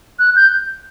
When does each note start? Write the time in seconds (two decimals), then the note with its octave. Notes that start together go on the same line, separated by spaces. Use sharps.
0.19 F#6
0.36 G6